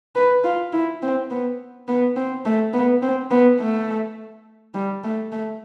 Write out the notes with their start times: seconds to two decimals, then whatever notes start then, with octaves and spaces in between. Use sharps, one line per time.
0.15 B4
0.44 F4
0.73 E4
1.02 C4
1.31 B3
1.88 B3
2.16 C4
2.45 A3
2.73 B3
3.02 C4
3.31 B3
3.60 A3
4.74 G3
5.04 A3
5.32 A3